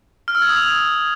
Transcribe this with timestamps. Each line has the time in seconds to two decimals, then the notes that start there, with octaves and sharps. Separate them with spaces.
0.28 F6
0.35 E6
0.42 G#6
0.49 D#6
0.56 F7